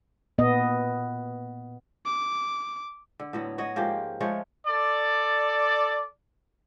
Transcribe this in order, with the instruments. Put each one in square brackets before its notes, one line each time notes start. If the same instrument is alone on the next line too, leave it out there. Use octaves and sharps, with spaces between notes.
[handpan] A#2 B3 D#5
[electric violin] D6
[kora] D3
A2 F#3 B3
F#4 C#5 D#5
G#2 F3 A#3 G4
F3 G#3 A3 C#5
[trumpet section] A4 D5